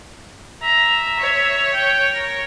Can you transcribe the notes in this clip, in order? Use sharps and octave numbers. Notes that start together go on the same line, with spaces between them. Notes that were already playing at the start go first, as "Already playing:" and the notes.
E5 A#5
C#5
G5
A#4